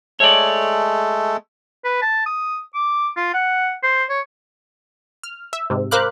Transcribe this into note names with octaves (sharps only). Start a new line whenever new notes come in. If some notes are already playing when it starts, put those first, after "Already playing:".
G#3 A3 A4 C#5 D5
B4
A5
D#6
D6
F4
F#5
C5
C#5
F6
E5
G#2 C3
A#4 C5 F5 B5 D6 F#6